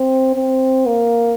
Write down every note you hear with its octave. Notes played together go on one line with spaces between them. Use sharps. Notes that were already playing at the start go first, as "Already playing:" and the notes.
Already playing: C4
C4
A#3